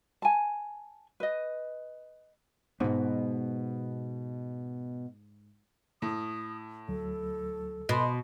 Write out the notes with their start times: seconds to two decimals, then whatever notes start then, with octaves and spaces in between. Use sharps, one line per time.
0.22 G#5 A5
1.20 B4 D#5
2.80 G#2 B2 B3
6.02 A2 D#6
6.88 D2 F#3 A4
7.89 B2 D#5 B5 C6